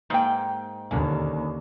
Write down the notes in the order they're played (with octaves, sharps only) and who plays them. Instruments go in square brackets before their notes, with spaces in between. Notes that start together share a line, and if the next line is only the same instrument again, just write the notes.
[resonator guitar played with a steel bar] G#2 G5 [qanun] A#3 F#5
[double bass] D#2 [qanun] D3 A#3 C#4